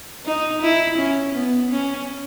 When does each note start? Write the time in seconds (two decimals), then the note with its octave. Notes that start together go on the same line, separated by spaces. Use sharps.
0.26 D#4
0.62 E4
0.98 C#4
1.35 B3
1.71 C#4